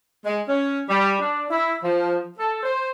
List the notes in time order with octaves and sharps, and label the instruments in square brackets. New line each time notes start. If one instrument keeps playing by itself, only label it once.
[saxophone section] G#3
C#4
G3
D4
E4
F3
A4
C5